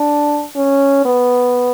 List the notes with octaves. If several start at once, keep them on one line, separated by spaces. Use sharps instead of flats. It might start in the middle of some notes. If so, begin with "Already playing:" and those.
Already playing: D4
C#4
B3